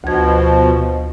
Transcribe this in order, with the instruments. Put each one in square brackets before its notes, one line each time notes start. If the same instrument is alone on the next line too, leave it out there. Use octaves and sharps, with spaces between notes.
[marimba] D2 G#6 [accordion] B2 F3